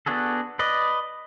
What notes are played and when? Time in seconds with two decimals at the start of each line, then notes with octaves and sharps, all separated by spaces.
0.06 B3 D4 F#4 G#4 A4
0.59 B4 D5 D#5